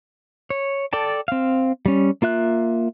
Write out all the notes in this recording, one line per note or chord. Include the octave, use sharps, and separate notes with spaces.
C#5
A4 D5 G5 A5
C4 F5
G3 C#4
A#3 F4 E5 F#6